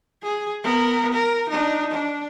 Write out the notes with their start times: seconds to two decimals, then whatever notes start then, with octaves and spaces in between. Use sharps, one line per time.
0.23 G#4
0.64 B3 A#4
1.14 A#4
1.50 D4 D#4
1.91 D4